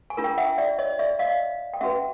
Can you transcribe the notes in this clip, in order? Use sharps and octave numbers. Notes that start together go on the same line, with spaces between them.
G#5
D4 F4 A#4
G5
E5 F#5
D5 E5
C#5 D#5
D5 E5
D#5 F5
G5
C#4 F#4 B4 E5 F#5